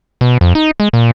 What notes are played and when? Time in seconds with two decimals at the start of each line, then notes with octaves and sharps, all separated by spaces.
0.21 B2
0.41 F2
0.55 D#4
0.80 G#3
0.93 A#2